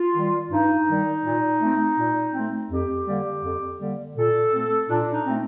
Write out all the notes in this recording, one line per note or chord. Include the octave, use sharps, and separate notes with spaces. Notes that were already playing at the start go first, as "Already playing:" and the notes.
Already playing: F4
D#3 G3
G2 D#4
D#3 G3
A#2
A3 C4
A#2
A3 C4
F2 G4
D3 G3 A#3
F2
D3 G3 A#3
A#2 A4
A3 C4
A#2 D4
D#4
A3 C4